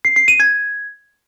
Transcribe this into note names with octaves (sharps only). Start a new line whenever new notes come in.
C7
C7
D#7
G#6